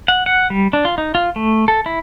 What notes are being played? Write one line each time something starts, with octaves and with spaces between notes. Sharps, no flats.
F#5
F#5
G3
D4
F4
D#4
F4
A3
A4
E4